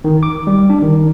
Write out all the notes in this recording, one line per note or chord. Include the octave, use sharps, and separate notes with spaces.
D#3
D6
G3
D4
D#3